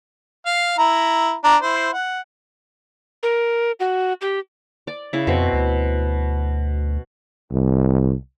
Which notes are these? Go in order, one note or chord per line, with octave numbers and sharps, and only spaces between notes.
F5
E4 A#5
D4 A#5
E4 C5
F#5
A#4
F#4
G4
D5
C#3 E4
F2 B2 C4
D2
C2